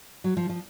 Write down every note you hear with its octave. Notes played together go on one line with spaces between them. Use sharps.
F#3
F3
F3